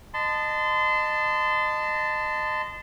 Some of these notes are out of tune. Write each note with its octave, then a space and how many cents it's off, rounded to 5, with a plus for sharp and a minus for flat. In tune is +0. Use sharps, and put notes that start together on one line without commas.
D#5 -20 A5 +5 C6 -30